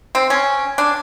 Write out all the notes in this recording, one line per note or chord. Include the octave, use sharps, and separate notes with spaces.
C4
C#4
D4